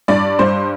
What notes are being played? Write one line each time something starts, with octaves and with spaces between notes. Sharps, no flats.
G2 D5
G2 C5